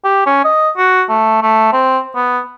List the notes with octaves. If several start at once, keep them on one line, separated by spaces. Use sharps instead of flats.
G4
C#4
D#5
F#4
A3
A3
C4
B3